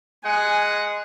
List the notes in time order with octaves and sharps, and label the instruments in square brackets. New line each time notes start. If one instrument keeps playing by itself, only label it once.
[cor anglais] G#3 [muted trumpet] F#5 [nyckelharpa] G#5